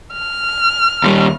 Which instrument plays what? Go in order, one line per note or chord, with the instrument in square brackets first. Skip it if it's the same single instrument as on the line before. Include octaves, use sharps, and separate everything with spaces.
[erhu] F6
[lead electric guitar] D#2 G3